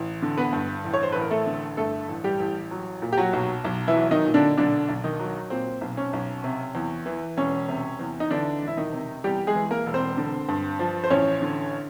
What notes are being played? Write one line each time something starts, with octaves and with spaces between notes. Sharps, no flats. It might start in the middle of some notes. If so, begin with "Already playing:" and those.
Already playing: A1
D3
B3 B4
G2
A1
C#5
C5
A1 B4
A#4
A3 A4
D3
G2 A3 A4
A1
G3 G4
A1
F#3
A#2
G4
F#3 F#4
B1
B1
E3 E4
F#3
D#3 D#4
A#2
D3 D4
B1 D3 D4
B1
D#3 D#4
F#3
A#2 C4
B1
C#4
B1
C3
E2
E3
E1 C#4
C3
E2
D#4
D3 E3 D4
E1
E4
D#3 D#4
C3
E2 G3 G4
G#3 G#4
E3
A#3 A#4
E1
C4 C5
D3
G2
F3
C5
A1 C#4 C#5
D3